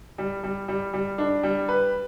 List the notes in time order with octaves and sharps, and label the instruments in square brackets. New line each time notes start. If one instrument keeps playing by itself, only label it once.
[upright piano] G3
G3
G3
G3
D4
G3
B4